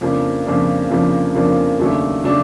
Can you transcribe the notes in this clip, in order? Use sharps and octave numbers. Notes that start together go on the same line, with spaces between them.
F2 C#3 F3 A#3 D4
F2 C#3 F3 A#3 D4
F2 C#3 F3 A#3 D4
F2 C#3 F3 A#3 D4
D#2 C#3 F#3 A3 D4
C#3 F#3 A3 D4